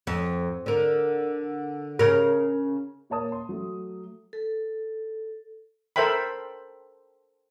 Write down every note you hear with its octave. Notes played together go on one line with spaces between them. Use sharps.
F2
D3 A#4
C#3 A#4
A#2 A#3 C#5 A5 D#6
C6
F#3 A3
A4
A4 A#4 C5 E5 G5 B5